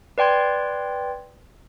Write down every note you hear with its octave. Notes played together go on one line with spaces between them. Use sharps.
B4 D5 G5 C6 G#6